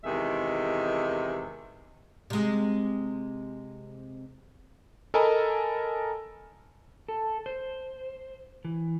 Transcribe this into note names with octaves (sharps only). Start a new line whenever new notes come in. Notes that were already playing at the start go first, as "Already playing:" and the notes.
E2 C3 D#3 G#3 E5
C3 G#3
A4 A#4 D#5 G#5 A5 B5
A4
C5
E3